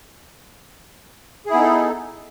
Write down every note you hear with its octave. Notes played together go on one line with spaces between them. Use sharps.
B3 D#4 E4 G#4 A4